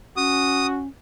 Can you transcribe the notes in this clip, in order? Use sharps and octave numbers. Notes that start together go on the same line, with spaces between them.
C#4 F#4 D#6